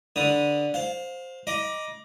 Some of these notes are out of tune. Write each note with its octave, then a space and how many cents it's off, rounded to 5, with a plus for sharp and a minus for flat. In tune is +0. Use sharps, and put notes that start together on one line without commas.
D3 +0 B4 -15 D#6 +0
C5 +0 F5 +30
D#5 +0 A#5 +45 D6 +0